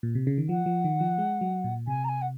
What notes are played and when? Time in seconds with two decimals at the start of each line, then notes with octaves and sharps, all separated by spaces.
0.03 A#2
0.15 C3
0.27 C#3
0.38 D#3
0.49 F3 F#5
0.66 F3
0.84 D#3
1.01 F3
1.18 G#3
1.41 F#3
1.64 A#2
1.87 C3 G#5
2.04 A#5
2.08 G#5
2.21 F#5